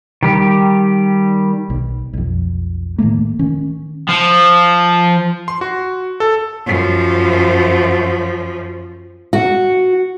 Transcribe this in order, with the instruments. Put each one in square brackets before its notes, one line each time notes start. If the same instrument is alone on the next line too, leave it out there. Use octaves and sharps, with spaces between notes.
[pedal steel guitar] D#3 G3 G4
[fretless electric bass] B1
B1 F2
A2 D#3 A3 A#3
D#3 C#4
[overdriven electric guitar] F3
[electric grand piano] C6
F#4
A4
[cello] F#2 F3
[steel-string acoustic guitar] F#4